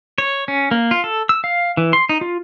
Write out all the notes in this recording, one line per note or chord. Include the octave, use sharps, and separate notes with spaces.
C#5
C#4
A#3
F4
A4
E6
F5
E3
C6
D#4
F4